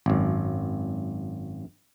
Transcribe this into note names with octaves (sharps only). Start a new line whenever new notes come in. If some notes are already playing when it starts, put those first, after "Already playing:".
G#1 F#2